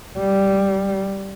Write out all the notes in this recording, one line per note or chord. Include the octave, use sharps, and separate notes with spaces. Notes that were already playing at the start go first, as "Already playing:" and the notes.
G3